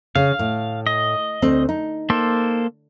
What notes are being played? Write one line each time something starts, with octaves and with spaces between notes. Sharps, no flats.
C#3 F5
A2
D#5
D2 C4
D#4
A#3 A4 C5